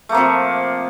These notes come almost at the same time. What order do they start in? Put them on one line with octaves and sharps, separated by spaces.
A3 A#3 C3 F3